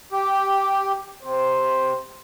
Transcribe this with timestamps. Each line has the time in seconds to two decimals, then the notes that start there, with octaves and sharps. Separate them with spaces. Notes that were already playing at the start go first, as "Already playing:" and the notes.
0.12 G4
1.23 C3 C5